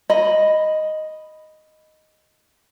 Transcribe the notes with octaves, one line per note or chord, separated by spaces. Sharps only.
D#5 B5